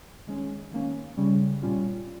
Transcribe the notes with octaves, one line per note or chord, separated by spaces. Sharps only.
D#3 G#3 C#4
D#3 A#3 C#4
C#3 G3 C#4
A#2 G3 C#4 F4